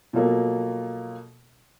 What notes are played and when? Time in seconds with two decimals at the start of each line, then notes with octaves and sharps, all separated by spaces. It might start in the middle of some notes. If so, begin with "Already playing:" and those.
0.13 B2 F3 F#3 A#3 A4